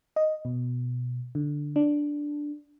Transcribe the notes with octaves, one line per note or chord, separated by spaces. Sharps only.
D#5
B2
D3
D4